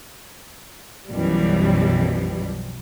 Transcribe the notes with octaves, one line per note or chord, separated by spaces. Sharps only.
B1 F#2 B2 E3 F3 G3